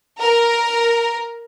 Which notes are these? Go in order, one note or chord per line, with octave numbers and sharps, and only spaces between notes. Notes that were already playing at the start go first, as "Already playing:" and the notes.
A#4